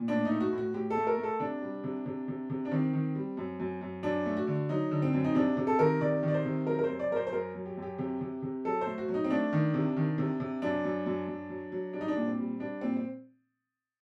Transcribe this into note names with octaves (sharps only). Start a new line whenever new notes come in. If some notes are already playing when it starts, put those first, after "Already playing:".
Already playing: A#2
A2 D4
A3 D#4
F#4
A2
F#4
A2 G4
A4
A3
A#4
A3
A4
C3 D4
G3
C3
C3
C3
C3
D4
D#3 C4
D#3
G3
F#2
F#2
F#2
F#2 D4
A3
F#4
D3
F#3 D#4
D3
C4
F#2
D#4
C3 D4
C3
A4
D#3 A#4
C3 D5
D#3
D5
C5
C3
F#3 A#4
A#4
C5
F#2
D5
F#2 A#4 C5
C5
F#2 A#4
F#3
G4
F#2
G4
C3 G4
C3
C3
F#3 A4
A3 C5
F#4
F#3
D#4
C4
A3 D4
D#3
C3
D#3
C3
C3
F#2 D4
F#2
F#2
F#2
F#3
F#3
G3 D4
D#4
D4
A#2
C4
G3
G3 D4
A#2 C4
C4